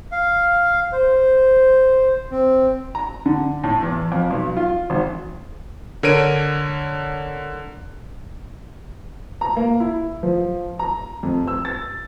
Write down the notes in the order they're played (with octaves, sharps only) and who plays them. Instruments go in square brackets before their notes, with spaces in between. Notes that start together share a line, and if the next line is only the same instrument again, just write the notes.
[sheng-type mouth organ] F5
C5
C4
[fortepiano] A#5
D3
A2
E2
F2
B1
F4
G#1
[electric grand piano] D3 A#4 C#5 D7 D#7
[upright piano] A#5
A#3
E4
F3
A#5
F2
E6
A6